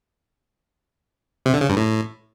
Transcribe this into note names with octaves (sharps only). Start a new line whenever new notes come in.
C3
D3
C#3
G2
A2